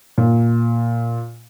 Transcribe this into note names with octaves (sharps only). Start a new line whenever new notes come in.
A#2